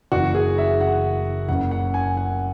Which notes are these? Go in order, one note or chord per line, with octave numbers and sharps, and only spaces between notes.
F#1 F#2 E3 F#4
G#4
E5
F#5
F#1 F#2 C#3 F#5
F#5
G#5
F#5